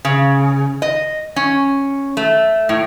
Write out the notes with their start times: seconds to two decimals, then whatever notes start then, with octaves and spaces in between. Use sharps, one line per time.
0.05 C#3
0.82 D#5
1.36 C#4
2.17 A3
2.69 A2